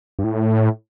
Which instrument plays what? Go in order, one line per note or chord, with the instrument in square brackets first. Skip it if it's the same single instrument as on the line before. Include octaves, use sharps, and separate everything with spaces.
[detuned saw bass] G2
A2